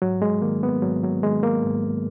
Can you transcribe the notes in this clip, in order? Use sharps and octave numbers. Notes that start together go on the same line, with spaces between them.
G#2 F#3
G#3
D#3 A#3
B3
G#2 F#3
F#3
D#3 G#3
A#3
G#2